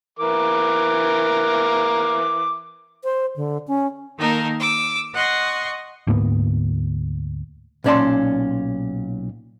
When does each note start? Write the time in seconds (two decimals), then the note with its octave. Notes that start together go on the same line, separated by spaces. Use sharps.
0.19 E3 A#4 D6
3.04 C5
3.36 D3
3.68 C#4
4.17 D#3 A#3 D#4 A4 A#4
4.60 D6 E6
5.13 D#5 F#5 C6 C#6
6.07 D2 G#2 A#3 B3
7.84 B1 A#2 C#4 D5 A5 C6